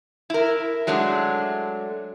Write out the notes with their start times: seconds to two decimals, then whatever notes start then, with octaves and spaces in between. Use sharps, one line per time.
0.30 E4 A#4
0.87 F#3 G#3 A3 D4